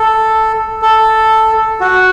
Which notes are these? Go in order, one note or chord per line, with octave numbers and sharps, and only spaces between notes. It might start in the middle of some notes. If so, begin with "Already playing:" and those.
Already playing: A4
A4
F#4